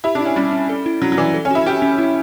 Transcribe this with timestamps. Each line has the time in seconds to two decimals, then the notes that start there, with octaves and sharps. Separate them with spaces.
0.04 E4 G4
0.15 D4
0.21 E4
0.26 C#4
0.36 G3 C#4
0.53 C#4
0.69 A4
0.86 E4
1.02 F#3 C#4
1.12 F#3
1.18 E3 D5
1.34 A4
1.45 C#4
1.51 E4 F#4
1.66 C#4 G4
1.82 C#4
1.99 E4